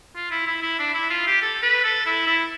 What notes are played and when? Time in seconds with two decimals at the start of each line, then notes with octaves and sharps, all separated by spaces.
0.15 F4
0.31 E4
0.47 E4
0.62 E4
0.79 D4
0.94 E4
1.10 F4
1.27 G4
1.42 A4
1.63 B4
1.84 A4
2.06 E4
2.27 E4